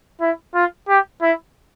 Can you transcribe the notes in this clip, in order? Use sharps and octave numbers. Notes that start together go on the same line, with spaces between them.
E4
F4
G4
E4